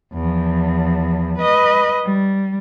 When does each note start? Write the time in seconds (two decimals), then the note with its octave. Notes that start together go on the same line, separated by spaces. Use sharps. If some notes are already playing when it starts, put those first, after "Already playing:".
0.14 E2 F3
1.38 B4 D#5
2.05 G3